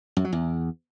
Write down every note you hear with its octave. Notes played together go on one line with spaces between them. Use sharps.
F#2
F#3
E2